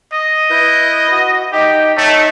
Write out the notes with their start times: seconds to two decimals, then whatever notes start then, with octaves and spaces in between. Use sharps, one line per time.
0.13 D#5
0.50 E4 B4 G6
1.11 F#4
1.52 D#4 G4 D#5 G5
1.97 A3 D#4 C#5 D#5